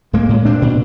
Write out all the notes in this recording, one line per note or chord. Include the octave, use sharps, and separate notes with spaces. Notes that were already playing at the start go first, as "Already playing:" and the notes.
A2 G#3 A#3
A2
A#2 C4 D4
A#2